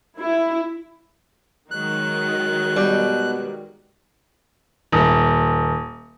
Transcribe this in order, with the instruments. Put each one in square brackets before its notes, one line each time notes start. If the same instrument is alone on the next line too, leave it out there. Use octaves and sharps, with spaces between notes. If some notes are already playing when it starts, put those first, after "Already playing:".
[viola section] E4
[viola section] D#3 F#3 G#3 [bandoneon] F#6
[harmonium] B2 [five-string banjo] G3
[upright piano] D#1